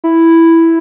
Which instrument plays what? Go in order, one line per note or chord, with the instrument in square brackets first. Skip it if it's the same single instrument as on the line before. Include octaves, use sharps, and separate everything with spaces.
[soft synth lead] E4